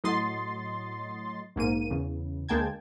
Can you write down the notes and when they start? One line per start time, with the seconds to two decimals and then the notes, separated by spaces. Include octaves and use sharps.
0.04 A2 F#3 D#5 C6 A6
1.56 A#1 G#2 A#3 D#7
1.90 E2 C#3
2.49 D2 G#3 A#3 G5 A5 G#6